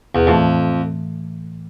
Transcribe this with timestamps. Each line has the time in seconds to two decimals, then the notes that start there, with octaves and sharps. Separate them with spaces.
0.15 E2
0.27 F2 A2 E3 A3